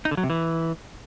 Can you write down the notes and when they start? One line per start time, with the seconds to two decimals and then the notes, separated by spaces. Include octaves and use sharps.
0.05 D#4
0.11 D3
0.17 F#3
0.24 C3
0.30 E3